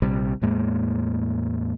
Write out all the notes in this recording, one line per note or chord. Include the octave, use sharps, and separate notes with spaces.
A#1 C3 G3
E2 A2 G#3 A#3